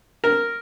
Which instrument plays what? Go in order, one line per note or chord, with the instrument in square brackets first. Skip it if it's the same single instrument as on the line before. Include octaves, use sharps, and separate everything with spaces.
[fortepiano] A#4